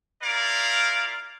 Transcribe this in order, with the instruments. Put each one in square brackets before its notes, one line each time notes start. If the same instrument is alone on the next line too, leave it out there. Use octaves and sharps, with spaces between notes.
[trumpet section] E4 F4 A#4 D5 F5